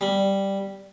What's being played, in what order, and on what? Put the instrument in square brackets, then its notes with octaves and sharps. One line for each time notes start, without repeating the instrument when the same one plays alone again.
[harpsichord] G3